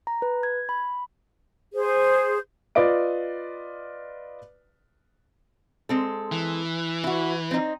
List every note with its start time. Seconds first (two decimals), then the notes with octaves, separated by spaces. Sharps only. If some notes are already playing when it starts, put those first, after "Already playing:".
0.07 A#5
0.22 B4
0.43 G#6
0.69 B5
1.75 G#4 C5
2.75 F4 B4 D5 D#5 D7
5.89 G#3 C4 A4
6.32 E3
7.04 E4 F#4
7.51 C4 D#4